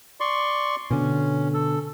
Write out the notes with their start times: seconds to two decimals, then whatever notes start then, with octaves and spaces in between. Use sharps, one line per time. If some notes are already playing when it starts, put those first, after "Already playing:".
0.20 D5 C6 C#6
0.91 B2 D3 C#4
1.54 A4